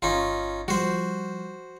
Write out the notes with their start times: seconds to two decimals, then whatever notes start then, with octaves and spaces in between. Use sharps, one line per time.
0.02 G1 C#4 D#4 F4
0.68 F3 G3 F#4 C5